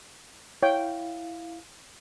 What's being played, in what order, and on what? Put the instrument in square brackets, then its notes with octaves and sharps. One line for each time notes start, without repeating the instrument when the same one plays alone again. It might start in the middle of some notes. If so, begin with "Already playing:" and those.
[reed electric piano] E4 F5 [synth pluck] C#5 [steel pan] G5